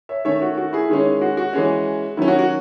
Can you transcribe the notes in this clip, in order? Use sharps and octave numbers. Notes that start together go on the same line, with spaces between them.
C#5 E5
D#3 A3 C#4 C#5 E5
F#4
F#4
E4 G#4
D#3 G#3 C#4
F#4
F#4
E3 G#3 C#4
D#3 F#3 C#4 E4
F#4
F#4